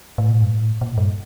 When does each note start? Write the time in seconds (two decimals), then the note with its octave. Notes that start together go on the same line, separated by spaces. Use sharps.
0.18 A2
0.30 A#2
0.33 A2
0.42 G2
0.50 A2
0.81 A#2
0.98 G2